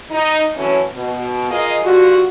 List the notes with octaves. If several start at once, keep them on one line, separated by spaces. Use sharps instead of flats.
D#4
E3 F#3 A3 C#4
B2
F4 G#4 A#4 D#5
G2 D3 F4 F#4